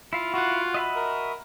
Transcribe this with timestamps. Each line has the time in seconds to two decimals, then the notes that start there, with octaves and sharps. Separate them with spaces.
0.13 E4 F4 F5
0.34 F4 F#4 F#5
0.74 D#5 E5 B5
0.96 A#4